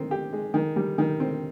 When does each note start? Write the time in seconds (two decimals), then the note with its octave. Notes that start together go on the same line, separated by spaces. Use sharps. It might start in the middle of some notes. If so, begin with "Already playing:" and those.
Already playing: D#3 C4
0.11 G4
0.33 G#3
0.54 D#3
0.76 G3
0.98 D#3
1.20 C4